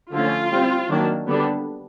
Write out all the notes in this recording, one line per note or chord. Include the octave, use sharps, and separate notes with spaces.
D3 F3 A3 C#4 F4
G3 C4
D#3 F#3 A#3 D4
D3 G3 B3 D4